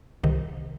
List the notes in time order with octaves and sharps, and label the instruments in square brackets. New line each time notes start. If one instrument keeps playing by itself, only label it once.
[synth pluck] C2 C3 D#3